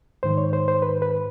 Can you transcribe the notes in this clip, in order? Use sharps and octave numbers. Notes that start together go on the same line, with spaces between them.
G#2 D#3 C5
C#5
C5
C5
B4
B4